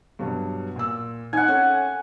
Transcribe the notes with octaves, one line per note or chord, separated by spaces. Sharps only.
G2 B2 F#3
A#2 E6
D#4 F#5 G#5
C#4 A4